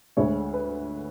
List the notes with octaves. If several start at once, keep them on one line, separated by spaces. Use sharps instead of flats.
D2 D3 G#3 C#5 E5
B4